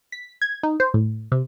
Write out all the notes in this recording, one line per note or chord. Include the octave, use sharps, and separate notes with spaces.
B6
G#6
D#4
C5
A2
C3